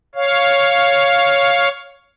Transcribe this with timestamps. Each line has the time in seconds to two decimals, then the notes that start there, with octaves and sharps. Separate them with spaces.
0.15 C#5 F5